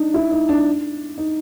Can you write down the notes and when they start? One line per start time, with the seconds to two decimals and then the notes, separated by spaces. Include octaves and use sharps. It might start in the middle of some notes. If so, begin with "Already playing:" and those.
Already playing: D4 D#4
0.14 E4
0.31 D#4
0.49 D4
1.18 D#4